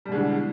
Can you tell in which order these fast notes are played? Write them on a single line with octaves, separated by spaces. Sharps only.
G3 B2 G#3 D3 E3